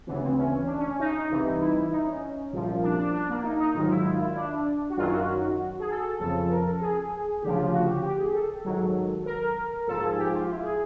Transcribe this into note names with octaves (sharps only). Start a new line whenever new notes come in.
D2 C#3 E3 B3
C4
C#4
C#4
D4
C#4
D#4
C2 C3 E3
E4
D#4
C#4
C2 A#2 F3
D4
D4
D4
A#3
D#4
D#4
G#2 D#3 F#3 F4
E4
F4
E4
D4
F#4
F#2 D#3 F#3 F4
F#4
G#4
A4
F2 C#3 F3 A4
A#4
A4
G#4
D2 C#3 F3 G4
F4
F#4
G4
G4
G#4
A4
G#2 D#3 F#3
A#4
G#2 F3 A4
G#4
G4
F4
E4
G#4